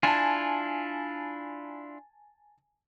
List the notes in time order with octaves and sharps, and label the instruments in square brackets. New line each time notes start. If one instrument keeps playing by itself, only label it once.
[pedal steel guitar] D4 E4 F4 [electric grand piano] G#5 A5